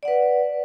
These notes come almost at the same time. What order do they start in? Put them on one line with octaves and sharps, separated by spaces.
D5 F#5 B4